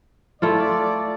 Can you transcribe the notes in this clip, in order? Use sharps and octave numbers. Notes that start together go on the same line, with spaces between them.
A3 E4 F4 D5